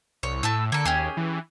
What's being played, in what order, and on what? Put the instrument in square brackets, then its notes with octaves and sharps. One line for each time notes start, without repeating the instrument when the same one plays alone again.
[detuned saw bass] C2 [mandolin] C#5
[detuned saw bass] A2 [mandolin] A3 A5 E6
[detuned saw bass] D3 [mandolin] A#3 A4
[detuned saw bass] D#2 [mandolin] C#4 G4 G#4
[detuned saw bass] E3